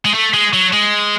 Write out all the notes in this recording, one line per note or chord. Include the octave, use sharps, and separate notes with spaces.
G#3
A3
G#3
F#3
G#3